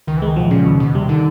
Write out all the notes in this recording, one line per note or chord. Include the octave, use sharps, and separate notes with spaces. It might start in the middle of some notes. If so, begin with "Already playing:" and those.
C#2 D#3
E3
D#3 G#3
B2 F3
A2
A#2 C#3
D#2 B2
D#2 B2
C3 G3
D3 D#3